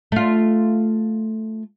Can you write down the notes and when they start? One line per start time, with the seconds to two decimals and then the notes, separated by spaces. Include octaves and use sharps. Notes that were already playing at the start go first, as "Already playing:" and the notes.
0.12 A3 F4